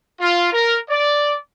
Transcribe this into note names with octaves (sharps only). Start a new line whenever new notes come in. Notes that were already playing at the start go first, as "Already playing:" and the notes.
F4
A#4
D5